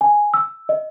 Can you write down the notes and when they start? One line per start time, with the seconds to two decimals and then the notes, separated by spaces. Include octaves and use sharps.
0.01 G#5
0.34 E6
0.69 D#5